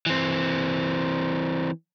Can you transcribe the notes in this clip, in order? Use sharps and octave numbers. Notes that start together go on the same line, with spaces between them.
E3 C4